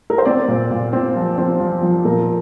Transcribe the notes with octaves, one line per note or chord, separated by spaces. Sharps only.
A#4
C5
C4 D5
A#2
A#2
C4
F3
C4
F3
F3
A#2 A#4